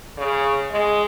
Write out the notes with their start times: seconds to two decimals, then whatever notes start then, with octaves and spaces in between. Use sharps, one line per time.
0.18 C#3
0.71 G#3